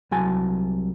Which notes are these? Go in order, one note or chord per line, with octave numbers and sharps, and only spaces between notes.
C2 F#3 G#5 A5